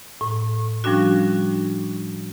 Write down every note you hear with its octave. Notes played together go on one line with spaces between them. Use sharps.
A2
F3 G3 C#4 D4 F#4